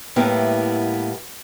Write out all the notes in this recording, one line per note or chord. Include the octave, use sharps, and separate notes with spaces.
A2 G3 A#3 B3 E4